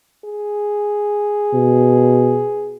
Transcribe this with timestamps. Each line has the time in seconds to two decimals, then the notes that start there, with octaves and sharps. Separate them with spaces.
0.25 G#4
1.54 B2